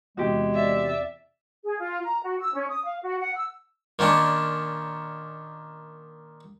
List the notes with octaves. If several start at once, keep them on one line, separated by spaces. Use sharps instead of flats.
E2 C3 G#3 F#4 G4
D5 E5
G#4
F4
A#5
F#4
E6
C#4
D#6
F5
F#4
F#5
E6
A#2 D#3 C#4 D4